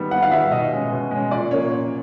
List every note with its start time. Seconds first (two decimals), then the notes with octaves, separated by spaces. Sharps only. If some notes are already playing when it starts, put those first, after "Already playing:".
Already playing: G#2 D#3 G3 B3
0.11 G#2 F#5
0.23 F5
0.31 D#3 G3 B3 E5
0.51 B2 D#5
0.72 G#3 C#4
0.91 B2
1.11 G#3 C#4
1.31 A#2 D5
1.51 F3 A#3 C#4 C#5
1.71 A#2